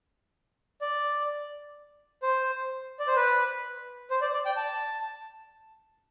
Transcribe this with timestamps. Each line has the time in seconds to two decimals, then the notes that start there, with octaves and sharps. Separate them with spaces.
0.81 D5
2.22 C5
2.99 D5
3.07 C5
3.16 B4
4.10 C5
4.21 D5
4.34 D5
4.46 G5
4.56 A5